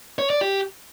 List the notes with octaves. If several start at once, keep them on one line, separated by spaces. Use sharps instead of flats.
C#5
D5
G4